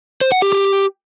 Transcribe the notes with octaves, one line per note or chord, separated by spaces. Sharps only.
C5
F#5
G4
G4